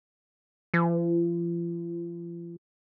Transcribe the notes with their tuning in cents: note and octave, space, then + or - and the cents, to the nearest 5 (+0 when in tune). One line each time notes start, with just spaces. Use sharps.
F3 -40